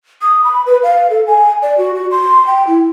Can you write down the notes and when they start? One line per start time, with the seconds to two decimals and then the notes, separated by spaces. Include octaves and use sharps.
0.22 D#6
0.44 B5
0.66 B4
0.83 F5
1.10 A4
1.27 G#5
1.62 D5
1.78 F#4
1.95 F#4
2.11 C6
2.47 G5
2.67 E4